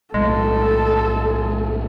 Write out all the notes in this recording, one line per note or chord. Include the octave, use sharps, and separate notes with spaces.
B1 A2 G#3 A4